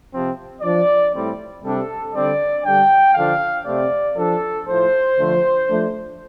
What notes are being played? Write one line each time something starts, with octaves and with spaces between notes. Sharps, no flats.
C3 F3 C4
F3 D4 D5
A2 G3 C4
C3 G3 D4 A4
D3 G3 C4 D5
D3 G3 D4 G5
D3 F3 D4 F5
C3 A3 C4 D5
F3 D4 A4
A2 F3 A3 C5
D3 F3 A3
F3 A3 D4